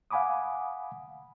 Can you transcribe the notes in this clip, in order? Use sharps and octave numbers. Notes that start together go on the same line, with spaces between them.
F5 F#5 G#5 B5 D6 D#6